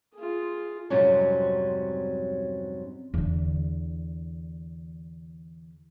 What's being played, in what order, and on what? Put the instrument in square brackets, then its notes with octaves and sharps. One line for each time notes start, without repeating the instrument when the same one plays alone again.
[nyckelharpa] F4 G#4
[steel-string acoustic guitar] F2 G#2 C3 F#3 G3 C#4
[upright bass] E2 D3